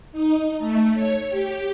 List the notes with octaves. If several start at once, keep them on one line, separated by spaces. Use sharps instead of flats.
D#4
A3
C#5
G4